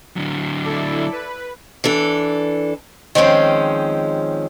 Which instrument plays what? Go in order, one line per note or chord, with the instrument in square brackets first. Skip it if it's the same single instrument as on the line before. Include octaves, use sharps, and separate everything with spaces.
[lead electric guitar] D3 F#3
[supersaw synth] E4 A4 D5
B4
[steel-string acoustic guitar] E3 D4 A4
D#3 F3 G#3 C4 C#4